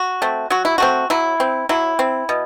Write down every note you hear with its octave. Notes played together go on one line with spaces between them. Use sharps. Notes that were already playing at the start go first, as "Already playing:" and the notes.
Already playing: F#4
A3 C4
F#3 F#4
E4
A3 C4 F#4
F#3 E4
C4
F#3 E4
C4
B2